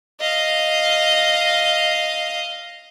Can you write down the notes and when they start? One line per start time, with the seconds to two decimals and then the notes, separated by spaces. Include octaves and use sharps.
0.20 D#5 F5